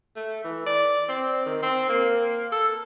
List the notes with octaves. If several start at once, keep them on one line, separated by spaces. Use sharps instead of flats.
A3
E3
D5
C4
D#3
C4
A#3
A4